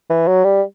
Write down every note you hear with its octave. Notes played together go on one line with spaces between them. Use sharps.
E3
F#3
G3